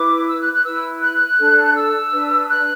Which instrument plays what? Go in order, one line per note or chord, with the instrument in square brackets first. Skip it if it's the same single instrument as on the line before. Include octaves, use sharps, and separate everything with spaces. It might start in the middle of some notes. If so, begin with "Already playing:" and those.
Already playing: [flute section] E4 B4 D6
E6
F#6
F#6
E4 B4 E6
F#6
D4 A4
E6
D4 B4
F#6